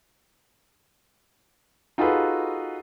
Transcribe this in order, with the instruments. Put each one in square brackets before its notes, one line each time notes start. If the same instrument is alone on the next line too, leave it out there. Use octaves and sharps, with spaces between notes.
[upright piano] D#4 F4 F#4 G#4 A4 B4